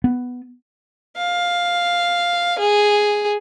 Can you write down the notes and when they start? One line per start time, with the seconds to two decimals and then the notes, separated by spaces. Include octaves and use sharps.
0.04 B3
1.17 F5
2.59 G#4